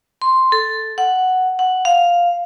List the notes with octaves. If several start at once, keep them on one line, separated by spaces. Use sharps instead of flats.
C6
A4
F#5
F#5
F5